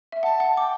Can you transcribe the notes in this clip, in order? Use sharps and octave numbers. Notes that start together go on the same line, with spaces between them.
E5
F#5 A5
F#5
A5
G5 D6